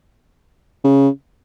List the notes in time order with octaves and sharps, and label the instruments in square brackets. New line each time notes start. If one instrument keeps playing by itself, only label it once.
[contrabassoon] C#3